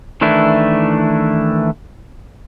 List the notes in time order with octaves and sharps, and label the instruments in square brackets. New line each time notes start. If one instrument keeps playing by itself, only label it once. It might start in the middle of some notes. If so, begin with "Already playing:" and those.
[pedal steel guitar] D#3 E3 A3 D4 E4